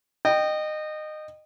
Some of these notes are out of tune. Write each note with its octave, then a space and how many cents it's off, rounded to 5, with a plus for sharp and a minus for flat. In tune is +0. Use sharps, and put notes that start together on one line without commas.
D#5 -20 G5 -5